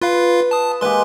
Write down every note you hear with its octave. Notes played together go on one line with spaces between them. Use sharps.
F4 B4 F5
A5 D#6
G#3 A#3 G4 B4 C6